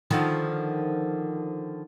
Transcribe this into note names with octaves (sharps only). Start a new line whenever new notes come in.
D3 D#3 F3